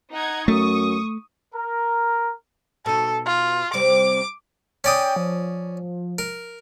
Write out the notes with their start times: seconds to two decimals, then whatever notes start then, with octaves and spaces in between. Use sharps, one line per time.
0.14 D#4 F#5 G#6
0.48 F#2 A3 C#6 D#6
1.54 A#4
2.86 B2 D#4 A4
3.26 F4
3.73 C3 G3 C4 D6
4.84 C#4 D5 G5 D#6
5.16 F3
6.18 A#4